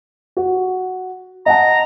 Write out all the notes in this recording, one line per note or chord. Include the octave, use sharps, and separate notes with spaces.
F#4
D#5 F#5 A5 A#5